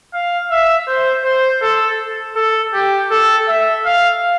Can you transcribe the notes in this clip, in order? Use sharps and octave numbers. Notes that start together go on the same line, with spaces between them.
F5
E5
C5
C5
A4
A4
G4
A4
E5
F5